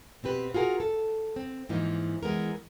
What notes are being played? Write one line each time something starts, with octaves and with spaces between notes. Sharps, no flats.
B2 C4 G4 B4
F4 F#4 G#4 A#4
A4
C4
G#2 E3 F3 A#3 D#4
E3 G#3 B3 A#4